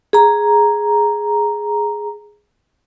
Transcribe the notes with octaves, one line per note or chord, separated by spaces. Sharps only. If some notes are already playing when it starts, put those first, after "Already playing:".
G#4 A#5